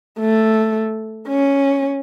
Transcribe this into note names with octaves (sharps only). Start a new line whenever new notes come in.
A3
C#4